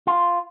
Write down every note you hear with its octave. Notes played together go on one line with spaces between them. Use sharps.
F4